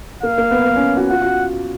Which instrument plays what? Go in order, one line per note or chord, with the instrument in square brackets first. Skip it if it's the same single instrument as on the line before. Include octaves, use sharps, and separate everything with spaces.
[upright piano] A#3 [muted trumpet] F5
[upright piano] A#3
B3
B3
C#4
F#4
[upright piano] F4 [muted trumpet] F#5
[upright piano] F#4